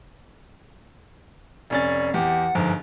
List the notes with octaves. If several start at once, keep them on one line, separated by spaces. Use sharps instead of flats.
F1 C#4 D5 A6
E2 G4 F#5
G1 G#2 F3